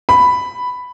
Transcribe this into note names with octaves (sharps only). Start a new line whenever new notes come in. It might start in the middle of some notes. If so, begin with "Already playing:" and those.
B5